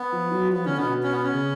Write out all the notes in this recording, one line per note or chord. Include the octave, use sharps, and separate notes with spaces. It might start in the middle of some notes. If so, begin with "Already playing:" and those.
Already playing: B3
F3
F#3
F3 B3
D3 C#4
B2 B3
C#4
B3
C#4
C#3